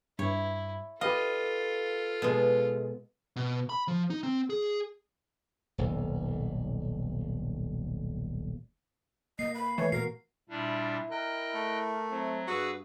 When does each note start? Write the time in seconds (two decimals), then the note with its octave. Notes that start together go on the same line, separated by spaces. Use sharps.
0.19 G2 E4 C#5
1.01 F4 G4 A4 B4 D#5 F5
2.22 B2 G#3
3.36 B2
3.69 B5
3.88 F3
4.10 D#4
4.23 C4
4.50 G#4
5.78 D#1 B1
9.39 A#3 D#5 C7
9.55 B5
9.78 E3 A3 C#5
9.92 A#2 B3 F#4 A#4 C7
10.50 A#2 G3 D4 E4
11.10 A#4 D#5 G5 F#6
11.55 A3
12.10 F#3 C4 E4
12.48 G2 F#4 G#4 B4 E6